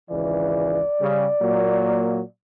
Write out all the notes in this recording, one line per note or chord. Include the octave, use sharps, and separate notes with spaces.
G#1 C#2 E3 D5
C#3 G3
A#2 F#3 A#3